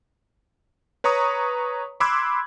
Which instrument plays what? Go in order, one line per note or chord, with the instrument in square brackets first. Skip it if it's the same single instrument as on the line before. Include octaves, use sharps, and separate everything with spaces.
[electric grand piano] B4 C#5 A#5 C#6 D#6
B5 C6 D6 E6 F#6 G#6